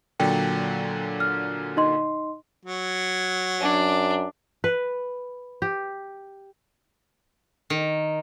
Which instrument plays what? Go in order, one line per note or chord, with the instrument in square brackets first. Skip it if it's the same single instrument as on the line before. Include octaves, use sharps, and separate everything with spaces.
[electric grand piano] A#2 D3 F#3 [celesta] G5
[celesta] F6
D#4 D#5 C6
[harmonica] F#3
[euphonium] F#2 [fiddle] D4
[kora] B4
G4
[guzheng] D#3